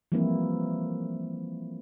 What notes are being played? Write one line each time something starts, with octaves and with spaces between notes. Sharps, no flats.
E3 F3 G3 A#3 C4 E4